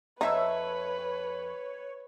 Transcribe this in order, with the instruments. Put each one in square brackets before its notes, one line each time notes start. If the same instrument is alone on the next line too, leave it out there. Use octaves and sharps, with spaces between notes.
[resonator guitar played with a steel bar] F2 E5 A5 [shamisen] D#4 [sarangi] B4 [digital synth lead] C#5